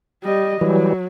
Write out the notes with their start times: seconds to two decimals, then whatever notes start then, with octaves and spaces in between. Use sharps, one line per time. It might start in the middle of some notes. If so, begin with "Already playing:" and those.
0.23 G3 D#5
0.61 E3 F#3 G3